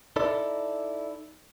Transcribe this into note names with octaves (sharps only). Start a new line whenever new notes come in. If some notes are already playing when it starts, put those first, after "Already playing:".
D#4 E4 A4 D5